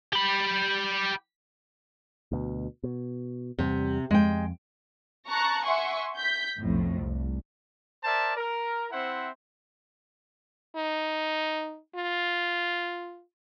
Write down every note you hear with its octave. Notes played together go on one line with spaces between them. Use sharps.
G4 B5
D2 B2
B2
E2 C3 G3
F2 G#3 G5
A5 A#5 C#6 F#6
E5 F#5 G#5 C6 C#6
G6 B6
B1 F2 A2
C2
A#4 C5 D5 E5 A5
A#4
C4 E4 C5 E5 F#5
D#4
F4